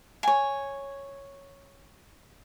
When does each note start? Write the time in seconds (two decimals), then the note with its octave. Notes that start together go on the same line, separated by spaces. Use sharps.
0.23 C#5 G#5